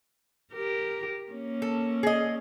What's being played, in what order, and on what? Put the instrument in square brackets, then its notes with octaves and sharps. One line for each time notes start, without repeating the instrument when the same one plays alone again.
[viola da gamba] G4 A#4
A#3 C#4
[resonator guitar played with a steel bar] A4
G#4 D#5